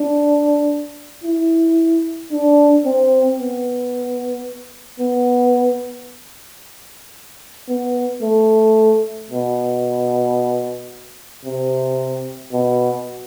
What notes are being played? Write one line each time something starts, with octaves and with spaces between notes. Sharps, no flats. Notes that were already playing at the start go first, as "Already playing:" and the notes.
Already playing: D4
E4
D4
C4
B3
B3
B3
A3
B2
C3
B2